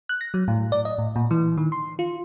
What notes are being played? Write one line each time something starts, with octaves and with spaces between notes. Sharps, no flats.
F#6
A#6
F#3
A2
D5
D#5
A2
A#2
E3
D#3
C6
F4